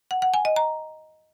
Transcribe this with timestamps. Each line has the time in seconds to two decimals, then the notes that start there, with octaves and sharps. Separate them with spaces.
0.11 F#5
0.22 F#5
0.34 G#5
0.45 D#5
0.56 A#5